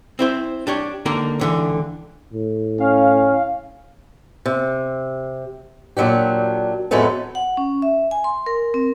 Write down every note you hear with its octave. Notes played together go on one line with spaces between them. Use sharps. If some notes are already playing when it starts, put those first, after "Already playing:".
C4 E4 C5
D4 G4 C#5
D3 A#3 D#4 A#4
C#2 D3 E3
A2
C#4 F5
C3
A#2 F#3 D4 G4
F2 A2 F#3 G#3 A3 B3
F#5
C#4
E5
G#5
C6
A#4
C4